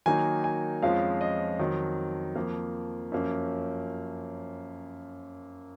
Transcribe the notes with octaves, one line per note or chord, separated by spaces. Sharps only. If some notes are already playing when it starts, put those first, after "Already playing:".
D#3 F#3 A#3 D#4 G#5
G#5
F2 F3 G#3 C#4 F4 F5
D#5
F2 D#3 F#3
F2 F3 A#3
F#2 F3 A#3 C#4 F4